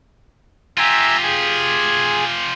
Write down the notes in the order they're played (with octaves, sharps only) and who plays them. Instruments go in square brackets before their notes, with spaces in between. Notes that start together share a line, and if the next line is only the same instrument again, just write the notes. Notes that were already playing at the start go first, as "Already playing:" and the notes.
[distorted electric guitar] F4 G4 [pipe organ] E5 G#5 A#5
[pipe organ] G#4 G#5